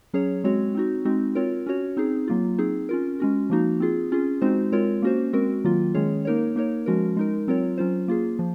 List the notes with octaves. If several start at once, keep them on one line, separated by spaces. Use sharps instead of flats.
F#3 C#4 G#4 C#5
G#3 C4 F#4 C#5
C4 D#4 F#4
G#3 C4 D#4 F#4
C4 F4 A#4 C#5
C#4 F#4 C#5
C4 D#4 G#4
F#3 A#3 F4
C4 D#4 G#4
C#4 F4 A#4
G#3 C#4 F#4
F3 A#3 D#4 F#4
C4 F4 G#4
C#4 F4 G#4
G#3 C4 D#4 F#4 C5
G#3 C4 F4 A#4 C#5
A#3 C#4 F#4 C5
G#3 C4 F#4 A#4
D#3 F#3 A#3 F4
D#3 G#3 C#4 G#4 C#5
A#3 D#4 A#4 C#5
A#3 D#4 A#4 C#5
F3 G#3 C#4 F#4 A#4
G#3 D#4 A#4
F#3 C4 F4 A#4 C#5
F#3 C#4 F4 C5
A#3 F4 G#4
F3